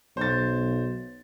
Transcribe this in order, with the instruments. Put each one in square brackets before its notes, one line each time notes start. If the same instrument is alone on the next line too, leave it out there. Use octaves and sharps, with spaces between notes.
[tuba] B1 [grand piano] C5 A6